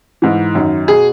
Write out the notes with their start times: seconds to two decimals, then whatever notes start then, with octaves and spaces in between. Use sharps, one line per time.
0.22 G#2 E3
0.55 F#2 D#3
0.88 B2 G#4